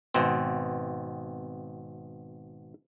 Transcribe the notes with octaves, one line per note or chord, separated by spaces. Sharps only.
G#1 B2 C4